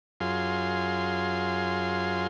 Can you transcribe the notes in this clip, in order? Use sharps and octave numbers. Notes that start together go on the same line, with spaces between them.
F#2 F4 G#4 C6